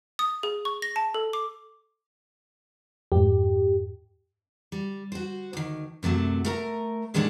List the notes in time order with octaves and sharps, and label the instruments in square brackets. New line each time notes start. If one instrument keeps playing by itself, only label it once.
[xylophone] D#6
G#4
C#6
A#6
A5
A4
D6
[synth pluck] F2 G#2 [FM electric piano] G4
[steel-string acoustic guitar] G3
F#4 C5
D2 D#3
F#2 C3 F#3 A3
A3 A#4 A#5
A#2 D#3 G3 G#3 C#4 D4